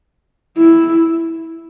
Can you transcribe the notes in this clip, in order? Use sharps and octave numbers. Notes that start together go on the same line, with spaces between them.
E4